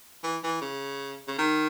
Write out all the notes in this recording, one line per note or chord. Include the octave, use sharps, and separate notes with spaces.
E3
E3
C#3
C#3
D#3